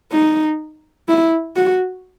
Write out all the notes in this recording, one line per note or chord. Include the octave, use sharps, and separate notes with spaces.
D#4
E4
F#4